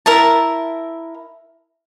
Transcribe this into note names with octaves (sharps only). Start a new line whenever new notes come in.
E4 A#4 E5 A5